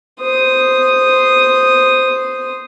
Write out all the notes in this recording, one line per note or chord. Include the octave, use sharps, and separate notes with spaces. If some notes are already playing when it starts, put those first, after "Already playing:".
C5 D#6